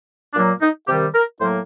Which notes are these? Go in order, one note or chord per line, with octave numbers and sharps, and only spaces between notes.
A#2 F#3 A#3 D4
D#4
C3 D#3 G3 G4
A#4
A2 F#3 A#3 C5